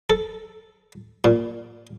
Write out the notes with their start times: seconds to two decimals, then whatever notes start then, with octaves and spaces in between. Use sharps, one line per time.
0.10 A4
1.24 A#2